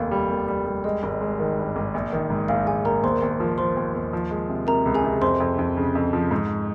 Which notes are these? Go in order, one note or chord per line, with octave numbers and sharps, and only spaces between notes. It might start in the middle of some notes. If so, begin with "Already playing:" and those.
Already playing: F1 D#2 F5
G3
D#2
G3
G3
G#3 D#5
G#1
G#3
D#3
G2
G#1
A#1
D#3
G#2
A#1 F5
A#1 G#4 G#5
A#1 A#4 A#5
D#2 C5 C6
D#2
F3
F3 C5 C6
D#2
D#2
F3
G#3
C3
C3 A#4 A#5
C#2
G#4 G#5
C3
F2 C5 C6
F2
F2
C#3
F2
F3
G#2